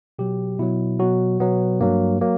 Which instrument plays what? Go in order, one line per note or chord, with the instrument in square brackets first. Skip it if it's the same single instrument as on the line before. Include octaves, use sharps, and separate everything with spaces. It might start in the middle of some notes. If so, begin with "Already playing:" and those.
[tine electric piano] B2 F#3 G4
B2 F#3 E4
B2 F#3 F#4
B2 F#3 B3
G2 F#3 A#3
F#3 A#3